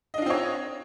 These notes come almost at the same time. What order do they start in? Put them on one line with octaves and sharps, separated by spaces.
D#5 D4 F4 C4 C#5